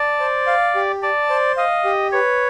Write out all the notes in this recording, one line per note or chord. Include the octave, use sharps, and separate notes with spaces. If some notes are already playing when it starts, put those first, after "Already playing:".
Already playing: D5 A5
C5
F5
G4
D5 A5
C5
D#5 F5
G4
B4 C#5